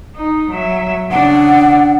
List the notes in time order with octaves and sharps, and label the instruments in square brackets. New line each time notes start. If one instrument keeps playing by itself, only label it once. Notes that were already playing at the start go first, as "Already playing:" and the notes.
[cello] D#4
F#3 E5
[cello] C#3 D4 [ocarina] F#5